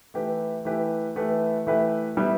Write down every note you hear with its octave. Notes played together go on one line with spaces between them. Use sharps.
E3 A3 E4 G4 B4
E3 A3 E4 G4 B4
E3 A3 E4 G4 B4
E3 A3 E4 G4 B4
G3 B3 E4 B4